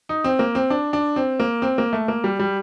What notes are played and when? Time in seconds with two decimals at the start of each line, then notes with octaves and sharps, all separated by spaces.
0.09 D#4
0.24 C4
0.39 A#3
0.55 C4
0.70 D4
0.93 D4
1.16 C4
1.40 A#3
1.62 C4
1.78 A#3
1.93 A3
2.08 A#3
2.24 G3
2.39 G3